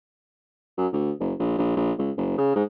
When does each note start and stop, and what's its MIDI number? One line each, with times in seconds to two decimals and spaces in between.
0.77 0.88 42
0.93 1.11 38
1.19 1.33 30
1.39 1.57 34
1.58 1.73 34
1.76 1.92 34
1.98 2.11 37
2.17 2.34 30
2.38 2.55 49
2.56 2.63 44